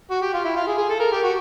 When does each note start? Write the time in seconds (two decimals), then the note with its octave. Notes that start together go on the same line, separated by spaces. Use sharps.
0.11 F#4
0.22 G4
0.34 F4
0.45 E4
0.56 F4
0.67 G#4
0.78 G#4
0.89 A4
1.00 A#4
1.12 G4
1.23 F#4